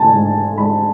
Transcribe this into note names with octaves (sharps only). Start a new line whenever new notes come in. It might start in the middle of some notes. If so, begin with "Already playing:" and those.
Already playing: A3 G#5 A5
G#2
G#2 B5